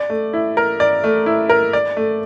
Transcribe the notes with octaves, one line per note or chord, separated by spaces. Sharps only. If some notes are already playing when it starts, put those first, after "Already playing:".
Already playing: D5
A3
E4
A#4
D5
A3
E4
A#4
D5
A3